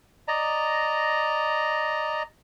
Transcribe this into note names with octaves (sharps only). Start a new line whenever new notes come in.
D5 D#5 A#5